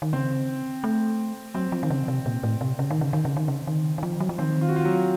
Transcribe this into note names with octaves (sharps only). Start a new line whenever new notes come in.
D#3
C#3 C4
A3
F#3 C4
F3
D#3
C#3
C3
A#2
A2
C3
C#3
D#3
C#3
D#3
C#3
D#3
C#3
D#3
D#3
F3
F#3
F3
D#3 C4
F4
F#4
F4
F#3